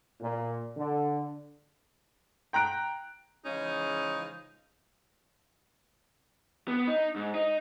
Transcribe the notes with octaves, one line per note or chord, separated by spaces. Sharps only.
A#2
D3
G5 A#5 F#6 D7
C#3 E3 F3 G#3 C#4 D#4
B3
D#4
G#2
D#4